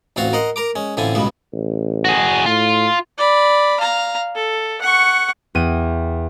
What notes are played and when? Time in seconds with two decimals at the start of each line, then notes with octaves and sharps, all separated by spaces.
0.16 A1 D2 C4 F4 F#4 F5
0.33 A#4 D#5 F#5 C6
0.56 A#4 A#5 D6
0.76 G#3 C#4
0.97 A1 A2 D3 C4 F4 G#5
1.15 C#2 G2 B2 G3 B3
1.52 A1
2.05 F#4 G#4
2.46 A2 F4
3.18 D5 B5
3.80 F5 A#5
4.35 A4
4.82 F#5 C#6
5.55 E2 B3 G5 D#7